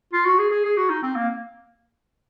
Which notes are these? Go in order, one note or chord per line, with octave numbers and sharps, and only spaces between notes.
F4
F#4
G#4
G#4
G#4
F#4
D#4
C4
A#3